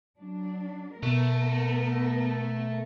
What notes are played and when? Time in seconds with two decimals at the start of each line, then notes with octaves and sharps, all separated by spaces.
0.18 F#3 D4
1.03 B2 A3 B3 A#4